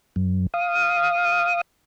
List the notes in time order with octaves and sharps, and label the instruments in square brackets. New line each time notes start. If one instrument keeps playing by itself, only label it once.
[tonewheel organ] F#2
F5 D#6